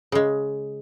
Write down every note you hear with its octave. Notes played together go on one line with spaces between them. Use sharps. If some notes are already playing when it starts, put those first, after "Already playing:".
C#3 G#3